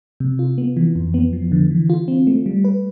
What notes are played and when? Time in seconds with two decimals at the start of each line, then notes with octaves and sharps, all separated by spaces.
0.20 C3
0.39 F4
0.58 B3
0.77 E3
0.96 F2
1.14 B3
1.33 F3
1.52 D3
1.70 E3
1.90 F4
2.08 C4
2.27 A3
2.46 G3
2.64 B4